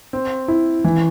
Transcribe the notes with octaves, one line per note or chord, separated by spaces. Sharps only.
C4
E4
E3